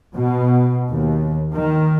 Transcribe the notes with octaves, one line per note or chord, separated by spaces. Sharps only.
B2
D#2
D#3